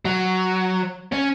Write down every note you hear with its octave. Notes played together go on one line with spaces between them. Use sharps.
F#3
C#4